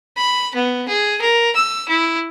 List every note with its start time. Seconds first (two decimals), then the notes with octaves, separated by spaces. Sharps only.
0.17 B5
0.55 B3
0.88 G#4
1.21 A#4
1.56 E6
1.89 E4